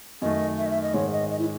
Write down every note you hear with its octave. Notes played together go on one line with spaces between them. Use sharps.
F#2 D#3 A3 D#5
E5
D#5
E5
D#5
G#2 D#3 G#3 C#5
D#5
D#5
E4